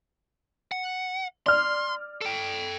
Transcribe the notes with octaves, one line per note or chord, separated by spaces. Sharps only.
F#5
D5 C6 F6
A4 G5